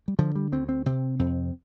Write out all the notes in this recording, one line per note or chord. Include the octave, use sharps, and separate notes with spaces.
G3
D3 F3
G3
D2 C4
C4
C3 C4
F2 C4